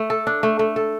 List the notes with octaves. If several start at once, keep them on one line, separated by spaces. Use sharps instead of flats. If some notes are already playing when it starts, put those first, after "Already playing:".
Already playing: A3
A4
D4
A3
A3
A4